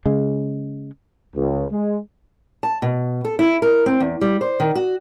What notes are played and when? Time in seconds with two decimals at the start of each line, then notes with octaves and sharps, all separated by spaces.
0.06 C#3 G#3
1.36 C#2
1.70 G#3
2.63 A5
2.82 B2
3.25 A4
3.39 E4
3.62 A#4
3.86 C4
4.00 E2
4.21 G3
4.41 C5
4.60 D#3
4.75 F#4